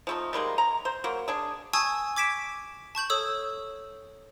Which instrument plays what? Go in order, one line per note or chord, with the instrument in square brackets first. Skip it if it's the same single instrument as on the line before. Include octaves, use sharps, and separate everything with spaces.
[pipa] F3 A3 D#4
D#3 G3 G#3 A#3
A#5
C5
F#3 A#3
D4 G#4
[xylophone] G#5 A5 C#6 D#6 E6 G#6
D6 G#6 B6 D7 E7
A5 C#6 G6 F#7
A4 C#5 D#6 E6